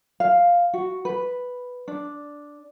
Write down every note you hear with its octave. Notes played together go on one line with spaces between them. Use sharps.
F5
F#4
B4
D4